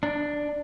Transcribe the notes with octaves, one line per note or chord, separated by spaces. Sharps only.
D4